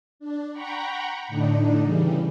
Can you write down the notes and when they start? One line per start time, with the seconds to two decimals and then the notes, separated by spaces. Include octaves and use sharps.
0.20 D4
0.53 F#5 G5 A#5 B5 C#6
1.28 A2 D3 D4 D#4
1.81 C#3 E3 G3